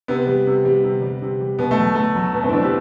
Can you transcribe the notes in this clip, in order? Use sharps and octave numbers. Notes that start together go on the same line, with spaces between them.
C3 B3
G3
C3
G3
C3
G3
C3
G3
B2 B3
A3
F#3
B2 A3
F#3
B2 B3
A3 C4
E4
F#3 B3 D4
G4 B4